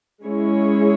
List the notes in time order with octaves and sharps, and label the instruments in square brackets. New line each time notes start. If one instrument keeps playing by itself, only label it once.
[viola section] G#3 C#4 E4 G#4 C#5